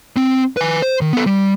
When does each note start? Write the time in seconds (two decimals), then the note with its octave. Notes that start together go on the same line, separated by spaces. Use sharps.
0.16 C4
0.57 B4 G#5
0.82 C5
1.01 D#3
1.13 B3 A4
1.27 G3